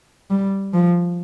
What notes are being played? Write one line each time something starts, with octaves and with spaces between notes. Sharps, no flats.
G3
F3